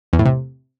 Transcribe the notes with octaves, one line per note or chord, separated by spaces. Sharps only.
E2
A2
C3